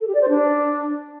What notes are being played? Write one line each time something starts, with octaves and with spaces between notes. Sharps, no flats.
A4
G4
D5
C5
D4